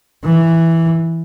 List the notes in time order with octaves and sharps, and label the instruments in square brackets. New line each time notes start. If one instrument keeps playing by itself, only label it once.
[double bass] E3